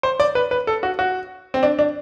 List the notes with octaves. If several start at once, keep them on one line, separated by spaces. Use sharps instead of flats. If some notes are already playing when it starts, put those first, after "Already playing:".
C5
D5
B4
B4
A4
F#4
F#4
C4
D4
D4